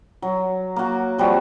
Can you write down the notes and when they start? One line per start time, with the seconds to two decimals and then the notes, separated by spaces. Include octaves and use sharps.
0.22 F#3
0.76 A#3 F#4
1.18 F3 G3 C4 F#4